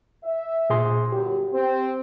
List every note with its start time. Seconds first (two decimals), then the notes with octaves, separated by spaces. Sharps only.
0.24 E5
0.70 A#2 G#4 C6
1.12 G1 F#2 F#3 G4
1.53 C4